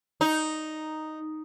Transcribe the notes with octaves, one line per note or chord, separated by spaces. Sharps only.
D#4